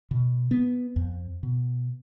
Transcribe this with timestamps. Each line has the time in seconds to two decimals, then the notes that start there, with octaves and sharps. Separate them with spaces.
0.11 B2
0.51 B3
0.96 F2
1.43 B2